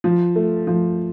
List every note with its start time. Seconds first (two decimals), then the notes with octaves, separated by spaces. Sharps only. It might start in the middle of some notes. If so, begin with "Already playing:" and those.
0.04 F3
0.36 A3
0.67 F3